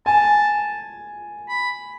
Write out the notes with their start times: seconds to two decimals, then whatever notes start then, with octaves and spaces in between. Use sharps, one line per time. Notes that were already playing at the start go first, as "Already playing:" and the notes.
0.06 G#5 A5
1.48 B5